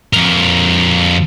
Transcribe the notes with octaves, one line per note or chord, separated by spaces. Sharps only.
F2 A#4